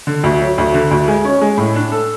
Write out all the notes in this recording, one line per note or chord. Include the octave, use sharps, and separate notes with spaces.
D3
D2
F#3
D2
D3
D2
G#3
C#4
G#3
A2
D4
A4